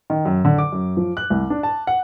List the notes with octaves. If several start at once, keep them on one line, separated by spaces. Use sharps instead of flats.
D#3
F#2
D3
D6
F#2
F3
F#6
C2
D4
A5
F#5